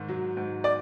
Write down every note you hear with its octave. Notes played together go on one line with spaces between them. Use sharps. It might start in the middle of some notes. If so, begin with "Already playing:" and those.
Already playing: G#2 D#3
F#3
G#2
D5